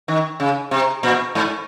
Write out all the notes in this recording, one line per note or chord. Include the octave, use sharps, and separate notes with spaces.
D#3
C#3
C3
A#2
G#2